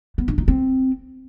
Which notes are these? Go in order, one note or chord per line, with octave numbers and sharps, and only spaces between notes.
B3
D4
D#4
C4